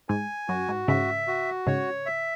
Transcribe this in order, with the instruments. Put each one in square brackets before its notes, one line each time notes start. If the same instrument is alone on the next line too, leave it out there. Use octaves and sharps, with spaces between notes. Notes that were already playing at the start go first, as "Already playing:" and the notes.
[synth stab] G#2 [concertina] G#5
[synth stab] F#2 [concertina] F#4
[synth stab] G#2
[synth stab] G#2 C#3 [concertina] E5
[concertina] F#4
[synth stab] G#2 C#3 [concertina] C#5
[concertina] E5